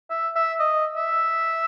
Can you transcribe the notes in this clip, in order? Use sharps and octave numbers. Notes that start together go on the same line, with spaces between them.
E5
E5
D#5
E5